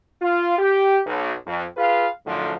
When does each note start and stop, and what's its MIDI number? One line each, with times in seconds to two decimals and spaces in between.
0.22 0.58 65
0.58 1.00 67
1.06 1.33 35
1.46 1.65 41
1.77 2.08 65
1.77 2.08 68
1.77 2.08 71
1.77 2.08 77
2.26 2.53 42
2.26 2.53 45
2.26 2.53 50
2.26 2.53 53